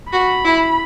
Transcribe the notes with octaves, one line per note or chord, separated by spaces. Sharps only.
F#4 B5
E4